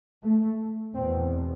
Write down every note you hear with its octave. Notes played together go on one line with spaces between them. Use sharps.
A3
E2 B2 C4